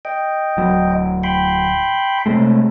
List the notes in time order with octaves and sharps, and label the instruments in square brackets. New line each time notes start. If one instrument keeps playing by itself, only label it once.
[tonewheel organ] D#5 G5
[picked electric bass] D1 F#3
[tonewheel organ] G5 B5 C6
[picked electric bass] C3 G#3 A3